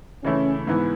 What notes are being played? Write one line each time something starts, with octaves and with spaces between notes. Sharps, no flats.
C#3 E3 A3 C#4 E4
G#2 E3 B3 E4